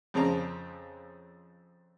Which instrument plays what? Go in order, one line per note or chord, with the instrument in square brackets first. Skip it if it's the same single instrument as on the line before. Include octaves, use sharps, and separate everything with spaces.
[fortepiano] F2 C#3 C4 A5 A#5